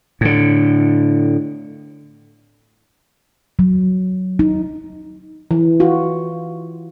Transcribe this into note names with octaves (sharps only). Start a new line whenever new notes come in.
A2 D3
F#3
D#4
E3
F4 F#4